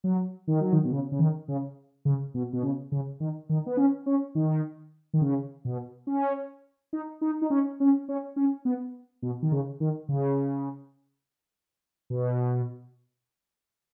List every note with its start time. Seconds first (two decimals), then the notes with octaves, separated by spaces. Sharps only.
0.04 F#3
0.47 D#3
0.60 F#3
0.72 D#3
0.84 B2
0.91 C#3
1.12 C#3
1.19 D#3
1.48 C#3
2.05 C#3
2.34 B2
2.53 B2
2.62 C#3
2.92 C#3
3.20 D#3
3.49 D#3
3.66 B3
3.77 C#4
4.06 C#4
4.35 D#3
5.13 D#3
5.21 C#3
5.65 B2
6.07 C#4
6.93 D#4
7.21 D#4
7.42 D#4
7.50 C#4
7.80 C#4
8.09 C#4
8.36 C#4
8.65 B3
9.22 B2
9.42 D#3
9.52 C#3
9.80 D#3
10.09 C#3
12.10 B2